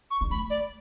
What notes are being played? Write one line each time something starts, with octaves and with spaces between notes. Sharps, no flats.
C#6
G3
A3 B5
D5